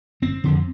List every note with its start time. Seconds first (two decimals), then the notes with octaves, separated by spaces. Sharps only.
0.22 G1 C4
0.44 F2 D3